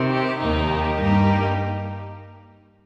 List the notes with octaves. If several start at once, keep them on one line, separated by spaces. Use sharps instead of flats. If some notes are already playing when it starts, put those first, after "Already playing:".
Already playing: C3 D#3 C4
G4
D#2 D#3 A#3 D#4
G4
G2 G3 A#3 D#4